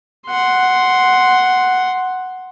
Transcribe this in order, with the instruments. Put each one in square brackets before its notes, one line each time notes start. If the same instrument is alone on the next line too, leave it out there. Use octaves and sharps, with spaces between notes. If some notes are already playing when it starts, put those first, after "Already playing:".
[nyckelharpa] F#5 C6